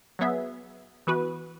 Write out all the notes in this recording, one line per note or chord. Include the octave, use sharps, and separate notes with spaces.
F#3 B3 G#4 E5
E3 B3 F#4 B4